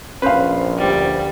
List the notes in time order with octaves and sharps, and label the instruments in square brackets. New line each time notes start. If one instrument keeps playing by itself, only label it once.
[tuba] A#1 [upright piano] C#4 F5 [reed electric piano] B4 C5
[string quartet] D2 G3